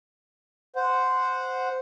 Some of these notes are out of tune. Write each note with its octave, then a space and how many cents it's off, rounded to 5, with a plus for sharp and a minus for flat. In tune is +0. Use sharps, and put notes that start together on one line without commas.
C5 -10 F#5 -10